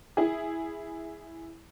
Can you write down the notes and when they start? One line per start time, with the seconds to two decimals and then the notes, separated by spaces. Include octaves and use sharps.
0.17 E4 G#4